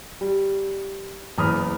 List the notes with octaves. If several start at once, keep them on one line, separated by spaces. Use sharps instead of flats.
G3
F#1 E2 A#5 B5 D#6 F6